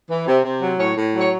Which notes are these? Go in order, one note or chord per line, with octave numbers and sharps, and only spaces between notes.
E3
C3
C3
F#3
A2 C#5
A2
F#3
C#5